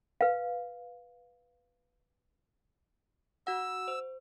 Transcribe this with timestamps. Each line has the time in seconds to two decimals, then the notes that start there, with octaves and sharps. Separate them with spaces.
0.21 B4 F5
3.47 F#4 F#5 E6
3.88 C5